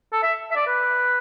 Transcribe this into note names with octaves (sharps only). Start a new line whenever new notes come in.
A4
E5
E5
D5
B4